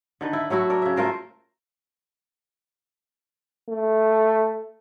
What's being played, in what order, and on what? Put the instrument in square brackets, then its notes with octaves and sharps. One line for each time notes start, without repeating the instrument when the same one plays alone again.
[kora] D3 D#3 B4
E4
F#3 A3 E4 F#4
D4 A#4
C#3 E5
A3 F4 A#4 C5
[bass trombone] A3